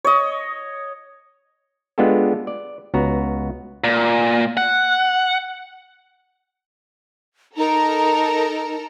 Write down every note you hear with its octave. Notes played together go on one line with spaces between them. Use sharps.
C#5 D#5
G#3 B3 D4 F4 G4 A4
D5
C#2 B3 F#4 A#5
A#2
F#5
D#4 A4 A#4 A#5